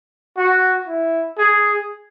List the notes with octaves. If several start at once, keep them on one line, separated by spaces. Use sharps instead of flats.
F#4
E4
G#4